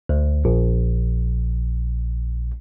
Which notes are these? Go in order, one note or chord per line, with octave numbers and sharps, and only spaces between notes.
D2
A#1